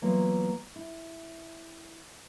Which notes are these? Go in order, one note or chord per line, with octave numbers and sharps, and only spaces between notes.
E3 F#3 A#3 B3 F4
E4